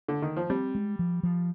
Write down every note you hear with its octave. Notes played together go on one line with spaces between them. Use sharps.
D3
D#3
F3
G3 C4
G#3
F3
F3